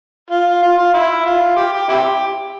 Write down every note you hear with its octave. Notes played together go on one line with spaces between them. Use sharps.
F4
F4
F4
E4
F4
G4
G4
C4 E4 G4